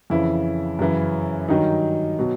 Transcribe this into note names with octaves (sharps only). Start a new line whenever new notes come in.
F2 C#3 E3 E4
F#2 C#3 E3
G2 D#3 F#3 D#4
B2 F#3